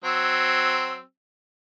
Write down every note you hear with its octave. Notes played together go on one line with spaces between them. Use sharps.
F#3 C4 E6